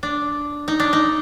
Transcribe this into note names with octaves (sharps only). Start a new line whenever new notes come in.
D4
D#4
D4
D#4